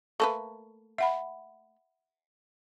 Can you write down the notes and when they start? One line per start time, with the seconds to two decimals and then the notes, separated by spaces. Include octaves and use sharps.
0.20 A3 A#3 B4 A5 C#6
0.98 E5 F#5 B5